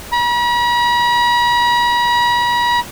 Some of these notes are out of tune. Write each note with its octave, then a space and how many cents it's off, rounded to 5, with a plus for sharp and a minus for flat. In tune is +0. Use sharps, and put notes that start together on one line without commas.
B5 -45